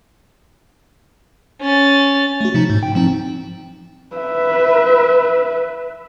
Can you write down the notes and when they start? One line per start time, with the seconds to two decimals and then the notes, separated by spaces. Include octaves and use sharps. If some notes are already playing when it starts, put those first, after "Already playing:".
1.61 C#4 A6
2.41 A3 F#4
2.54 C3 F3 D#4
2.70 G#2
2.83 G5
2.95 F3 C4 D#4
4.16 B4 E5